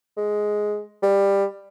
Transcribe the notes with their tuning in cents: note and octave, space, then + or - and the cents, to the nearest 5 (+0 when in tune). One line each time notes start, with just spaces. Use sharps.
G#3 +10
G3 +15